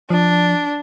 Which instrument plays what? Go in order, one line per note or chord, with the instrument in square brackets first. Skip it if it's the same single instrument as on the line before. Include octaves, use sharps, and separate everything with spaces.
[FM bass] F3 [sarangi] D4